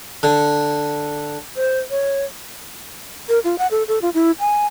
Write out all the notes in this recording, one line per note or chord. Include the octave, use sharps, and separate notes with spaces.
D3
C5
C#5
A#4
F4
F#5
A4
A4
F4
E4
G#5